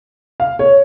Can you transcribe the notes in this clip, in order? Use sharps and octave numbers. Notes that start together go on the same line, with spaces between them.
F5
C#5